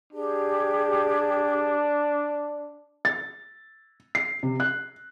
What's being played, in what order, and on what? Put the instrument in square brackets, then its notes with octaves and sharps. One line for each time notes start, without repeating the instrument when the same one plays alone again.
[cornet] D4 [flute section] G4 G#4
[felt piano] A6
C7
C3
F#6